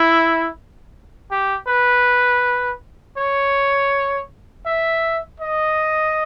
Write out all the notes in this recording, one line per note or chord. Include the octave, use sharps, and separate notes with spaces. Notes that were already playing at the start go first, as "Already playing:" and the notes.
Already playing: E4
G4
B4
C#5
E5
D#5